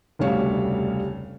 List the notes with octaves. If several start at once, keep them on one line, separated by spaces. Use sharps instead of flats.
F1 D2 C#3 G3 C#5 F5